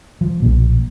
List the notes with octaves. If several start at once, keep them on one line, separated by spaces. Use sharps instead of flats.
F3
B1 A#2 F3